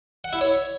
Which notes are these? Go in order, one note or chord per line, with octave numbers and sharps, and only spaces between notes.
F#5
E4
C#5